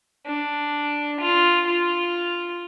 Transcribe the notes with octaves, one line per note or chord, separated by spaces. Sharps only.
D4
F4
F4